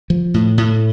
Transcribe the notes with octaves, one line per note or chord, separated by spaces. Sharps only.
F3
A2
A2